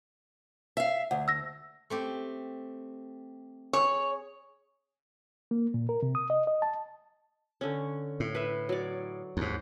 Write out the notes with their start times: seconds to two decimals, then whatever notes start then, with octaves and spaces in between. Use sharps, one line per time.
0.77 E5 F5
1.11 D2 F#5
1.28 E6 A#6
1.90 A3 C4 G4
3.73 G#4 C#5
5.51 A#3
5.74 A#2
5.89 A#4
6.03 C3
6.15 D#6
6.30 D#5
6.47 D#5
6.62 A5
7.61 D3 C#4
8.20 A2
8.35 B4 E5
8.69 F#3 D5
9.37 D#2 G#2